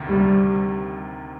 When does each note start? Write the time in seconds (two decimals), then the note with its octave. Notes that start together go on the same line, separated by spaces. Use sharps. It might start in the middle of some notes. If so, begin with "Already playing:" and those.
Already playing: D2 C3 D#3
0.09 G3